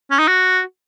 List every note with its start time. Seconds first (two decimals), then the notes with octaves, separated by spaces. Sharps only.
0.11 C#4
0.19 D#4
0.28 F#4